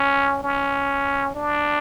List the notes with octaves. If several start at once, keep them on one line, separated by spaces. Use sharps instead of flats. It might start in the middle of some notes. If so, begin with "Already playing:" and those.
Already playing: C#4
C#4
D4